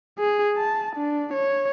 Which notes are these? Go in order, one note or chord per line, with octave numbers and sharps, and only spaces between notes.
G#4
A5
D4
C#5